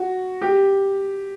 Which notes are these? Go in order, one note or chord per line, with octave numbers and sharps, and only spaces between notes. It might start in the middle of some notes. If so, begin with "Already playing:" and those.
Already playing: F#4
G4